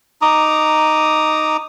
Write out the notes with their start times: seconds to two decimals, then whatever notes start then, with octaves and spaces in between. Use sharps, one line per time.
0.22 D#4 A#5 D6 D#6